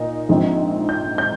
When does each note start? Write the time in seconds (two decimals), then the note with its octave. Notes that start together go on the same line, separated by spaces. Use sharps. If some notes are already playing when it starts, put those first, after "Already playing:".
Already playing: A#2 D#4
0.29 A#1 G#2 F3 C4 D#4
0.89 G6
1.18 G6